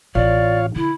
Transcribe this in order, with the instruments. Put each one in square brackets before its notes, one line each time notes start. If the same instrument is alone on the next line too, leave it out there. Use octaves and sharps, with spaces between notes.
[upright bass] A1 C4 [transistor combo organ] F4 C#5 F5 [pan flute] D5
[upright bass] D3 [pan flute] E4